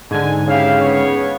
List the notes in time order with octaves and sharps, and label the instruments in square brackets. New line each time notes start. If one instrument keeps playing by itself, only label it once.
[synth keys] G#2 D3 [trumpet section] G#5
[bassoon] C#3 [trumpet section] E4 G4 F5
[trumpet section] B3 C#5